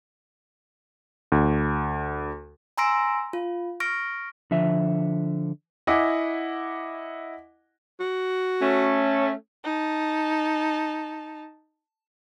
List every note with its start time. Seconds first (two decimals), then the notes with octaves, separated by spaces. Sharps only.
1.32 D2
2.77 G#5 A#5 C6 E6 A#6 D7
3.33 F4
3.80 C#6 F6 A#6 D7
4.51 D3 F3 E5
5.87 E4 D#5 F#5 G#5 D6
8.00 F#4
8.62 A3 C#4
9.64 D#4 A5